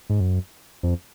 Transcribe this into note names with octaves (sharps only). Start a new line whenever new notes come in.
G#2
F#2
F2